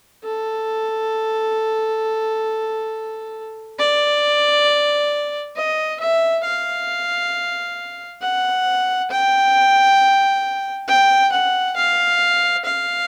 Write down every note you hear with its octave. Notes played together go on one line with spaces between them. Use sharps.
A4
D5
D#5
E5
F5
F#5
G5
G5
F#5
F5
F5